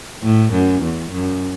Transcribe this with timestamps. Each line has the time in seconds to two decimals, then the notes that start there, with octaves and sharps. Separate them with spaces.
0.23 A2
0.52 F#2
0.82 E2
1.11 F#2